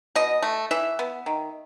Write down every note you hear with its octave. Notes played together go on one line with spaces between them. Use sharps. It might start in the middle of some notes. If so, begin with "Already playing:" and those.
B2 D#5
A3
E3 E5
B3
D#3